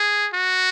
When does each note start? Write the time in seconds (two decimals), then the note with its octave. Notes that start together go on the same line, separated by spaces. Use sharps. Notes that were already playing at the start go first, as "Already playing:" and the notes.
Already playing: G#4
0.34 F#4